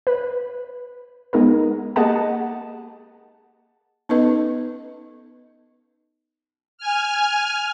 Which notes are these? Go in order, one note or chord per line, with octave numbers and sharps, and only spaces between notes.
B4
G#3 B3 D#4 G#4 A#4
A#3 G4 G#4 D#5 F#5 A5
B3 C#4 D#4 A4 B4 D#5
G#5 F6